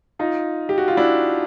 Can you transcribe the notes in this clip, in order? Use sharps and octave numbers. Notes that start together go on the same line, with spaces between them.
D#4 F4
G4
F#4
F4
D4 E4